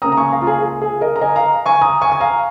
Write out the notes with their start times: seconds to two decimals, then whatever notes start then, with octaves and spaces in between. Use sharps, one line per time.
0.02 C#2 C#3 A#3 C#4 A#5 D#6
0.12 A#5
0.17 G#5 C#6
0.31 F5 A#5
0.42 F4
0.47 G#4
0.62 G#4
0.82 G#4
1.01 A#4 D#5
1.16 A#5
1.21 D#5 G#5
1.36 F5 A#5
1.66 G#5 C#6
1.82 A#5 D#6
2.02 G#5 C#6
2.12 G#5
2.20 F5 A#5